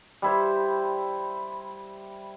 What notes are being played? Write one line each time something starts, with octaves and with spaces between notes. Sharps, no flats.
G3 E4 C5